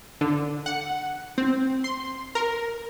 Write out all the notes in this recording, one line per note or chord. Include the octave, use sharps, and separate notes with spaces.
D3
F#5
C4
C6
A#4